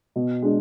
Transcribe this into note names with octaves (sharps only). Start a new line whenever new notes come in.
B2
G#3 D4 G#4